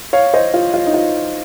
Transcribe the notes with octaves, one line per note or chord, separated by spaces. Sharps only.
C#5 F5
C5 D#5
F4
F4
D#4
F4